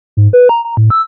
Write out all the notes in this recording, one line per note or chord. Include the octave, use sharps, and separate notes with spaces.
G#2
B4
A#5
A#5
A2
E6